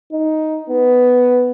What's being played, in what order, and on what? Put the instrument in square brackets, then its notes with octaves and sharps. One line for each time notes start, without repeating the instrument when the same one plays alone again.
[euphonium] D#4
B3